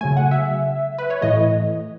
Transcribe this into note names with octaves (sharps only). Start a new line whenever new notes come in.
C#3 F#3 A3 G#5
F#5
E5
B4
C#5
A2 E3 A3 D#5